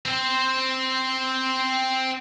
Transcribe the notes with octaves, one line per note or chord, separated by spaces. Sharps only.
C4 C5